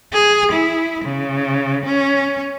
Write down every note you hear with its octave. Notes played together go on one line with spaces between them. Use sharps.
G#4
E4
C#3
C#4